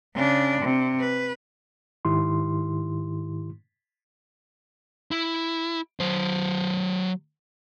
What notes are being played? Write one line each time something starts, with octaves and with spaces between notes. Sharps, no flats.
C#3 D4
C3
B4
G#2 D#3 E4 G4 C6
E4
F#3 C5